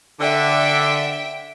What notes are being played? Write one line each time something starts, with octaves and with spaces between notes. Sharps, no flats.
D3 E5 G5